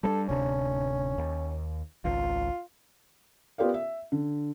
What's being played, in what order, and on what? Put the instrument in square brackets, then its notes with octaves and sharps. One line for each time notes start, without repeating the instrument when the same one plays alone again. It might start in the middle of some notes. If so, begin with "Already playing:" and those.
[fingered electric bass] G3 A#3 D4 [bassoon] A4
[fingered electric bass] D1 C3 D4 [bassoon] C#4
[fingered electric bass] D#2
[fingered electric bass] G#1 C#2 [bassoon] F4
[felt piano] B3 F4 G4 A#4 D5 F5
E5
D3